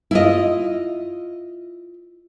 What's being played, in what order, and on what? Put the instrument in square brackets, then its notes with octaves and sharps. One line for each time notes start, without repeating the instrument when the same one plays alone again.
[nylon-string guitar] E4 F4 D#5